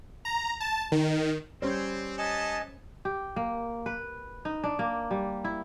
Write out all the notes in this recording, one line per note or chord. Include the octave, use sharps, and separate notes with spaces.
A#5
A5
D#3
G3 C4 C#4 C5 C#5
B3 A4 D#5 G#5 A5
G4
A#3
B4
D#4
D4
A#3
G3
E4